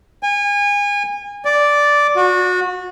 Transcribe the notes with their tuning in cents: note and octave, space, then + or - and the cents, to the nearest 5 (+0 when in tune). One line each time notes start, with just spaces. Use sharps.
G#5 -30
D5 -5
F#4 -25